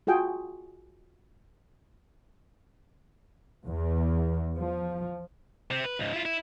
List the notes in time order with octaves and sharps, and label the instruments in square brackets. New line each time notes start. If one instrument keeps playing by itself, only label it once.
[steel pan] F4 F#4 G#4 G5
[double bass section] E2
F3
[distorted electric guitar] C3 C4
B4
C#2 G#2
E4 F4
E4